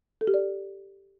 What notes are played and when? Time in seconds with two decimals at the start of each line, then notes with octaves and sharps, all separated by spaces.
0.21 A4
0.27 G4
0.34 D5